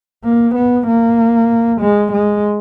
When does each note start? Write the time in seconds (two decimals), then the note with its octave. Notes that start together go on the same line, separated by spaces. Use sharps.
0.25 A#3
0.55 B3
0.87 A#3
1.82 G#3
2.13 G#3